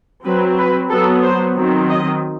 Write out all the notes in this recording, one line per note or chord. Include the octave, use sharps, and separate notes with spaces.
F#3 C4 B4
B4
F#3 B3 A4
C5
D#3 F#3 C4
D#5